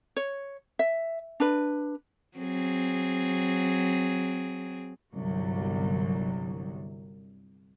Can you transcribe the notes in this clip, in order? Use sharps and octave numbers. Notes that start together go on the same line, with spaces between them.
C#5
E5
D4 B4
F#3 C4 G#4
G1 C2 F#3